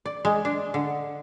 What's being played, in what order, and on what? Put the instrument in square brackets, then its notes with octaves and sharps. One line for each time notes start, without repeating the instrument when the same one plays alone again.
[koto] D5
G#3
D4
D3